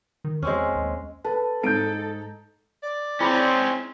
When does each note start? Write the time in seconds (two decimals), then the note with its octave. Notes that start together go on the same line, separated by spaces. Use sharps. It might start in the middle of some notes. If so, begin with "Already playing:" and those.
0.24 D#3
0.43 E2 G#3 C4 C#4
0.76 D#2
1.24 A4 B4
1.63 G#2 D#4 A4 A#5 G6 D7
2.83 D5
3.20 C4 C#4 D#4 E4 G#4 B5